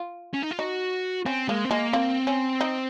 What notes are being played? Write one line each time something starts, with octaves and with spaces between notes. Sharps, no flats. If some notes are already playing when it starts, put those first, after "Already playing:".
Already playing: F4
C#4
D#4
F4
D#4 F#4
C4 C#4
G#3 A#3
C4
G#3 A#3
A#3 C4
C#4
D#4